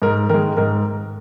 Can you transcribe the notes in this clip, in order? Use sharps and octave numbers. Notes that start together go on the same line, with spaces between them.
G#2 A#4
D#3 G#3 A#4
G#2 A#4